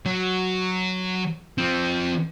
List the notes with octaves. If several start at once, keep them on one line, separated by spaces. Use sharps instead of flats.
F#3
F3 C4